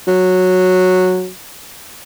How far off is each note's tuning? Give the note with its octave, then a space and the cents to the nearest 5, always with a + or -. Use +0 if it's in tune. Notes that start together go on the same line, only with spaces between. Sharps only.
F#3 -10